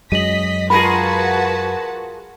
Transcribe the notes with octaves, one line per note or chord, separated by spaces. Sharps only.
F#2 F#3 G#3 D#5 B6 D#7 F#7
F4 F#4 G#4 A#4 B4 A5 B5 A#6